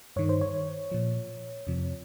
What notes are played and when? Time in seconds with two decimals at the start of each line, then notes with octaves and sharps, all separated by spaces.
0.16 G2 D#3 C#5
0.29 C5
0.41 C#5
0.91 A#2 F3
1.67 F2 C3 F3